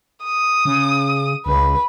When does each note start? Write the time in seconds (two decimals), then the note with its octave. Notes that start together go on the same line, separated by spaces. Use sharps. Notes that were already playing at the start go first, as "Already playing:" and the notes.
0.25 D#6
0.65 C#3
1.46 C#2 B4